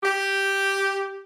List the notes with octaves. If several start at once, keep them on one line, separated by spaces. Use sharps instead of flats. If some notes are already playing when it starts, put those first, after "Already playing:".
G4